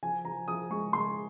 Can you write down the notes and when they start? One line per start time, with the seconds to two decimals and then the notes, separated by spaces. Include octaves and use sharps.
0.03 F3 G#5
0.25 F3 A#5
0.48 F3 D#6
0.70 G#3 C#6
0.93 G#3 C6